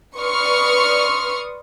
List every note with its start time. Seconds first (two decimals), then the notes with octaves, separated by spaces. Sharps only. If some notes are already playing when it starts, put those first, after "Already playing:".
0.17 B4 D5 C6 C#6 D#6 F6